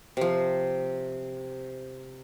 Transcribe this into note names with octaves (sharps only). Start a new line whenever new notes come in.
C3 F3